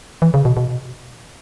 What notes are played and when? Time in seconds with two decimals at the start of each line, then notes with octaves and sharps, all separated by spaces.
0.22 E3
0.34 C#3
0.45 B2
0.57 B2